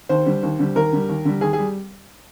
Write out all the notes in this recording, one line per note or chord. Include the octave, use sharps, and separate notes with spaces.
D#2 C5
D3 G3
D#2
D3 G3
D#2 A#4
D3 G3
D#2
D3 G3
D#2 G#4
G#4
G3